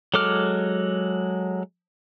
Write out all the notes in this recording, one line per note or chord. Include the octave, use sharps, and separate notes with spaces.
F#3 G#3 A4 D6 F6